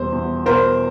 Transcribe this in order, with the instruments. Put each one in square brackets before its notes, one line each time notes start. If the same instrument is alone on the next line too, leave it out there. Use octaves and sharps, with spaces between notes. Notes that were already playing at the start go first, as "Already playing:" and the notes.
Already playing: [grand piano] E2 B2 G3 [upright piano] C5
[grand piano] E2
[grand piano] B2 [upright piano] A#4 C5